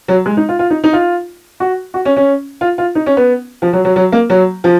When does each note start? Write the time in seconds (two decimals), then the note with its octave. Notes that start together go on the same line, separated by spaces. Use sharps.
0.08 F#3
0.26 G#3
0.37 D#4
0.49 F4
0.59 F4
0.70 D#4
0.84 D#4
0.93 F4
1.60 F#4
1.94 F#4
2.05 C#4
2.17 C#4
2.61 F4
2.78 F4
2.95 D#4
3.06 C#4
3.17 B3
3.62 F3
3.73 F#3
3.85 F#3
3.96 F#3
4.12 A#3
4.30 F#3
4.64 F3